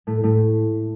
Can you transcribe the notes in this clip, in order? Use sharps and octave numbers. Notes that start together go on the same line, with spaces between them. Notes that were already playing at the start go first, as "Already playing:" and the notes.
A2 A3
A2 A3